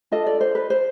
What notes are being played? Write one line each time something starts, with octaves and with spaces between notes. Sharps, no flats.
D4 F4 A4 D#5
D5
C5
B4
C5